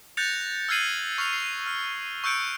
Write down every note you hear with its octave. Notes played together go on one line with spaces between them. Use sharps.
F#6 G6 A6 A#6 C#7 F7
E6 F6 G#6 C7 D#7 F#7
C#6 F6 C7 F7
C7
F6
C#6 E6 F#6 G6 C#7 D7